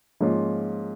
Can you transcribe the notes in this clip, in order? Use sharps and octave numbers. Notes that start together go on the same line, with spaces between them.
G#2 F3 A#3 C#4 F4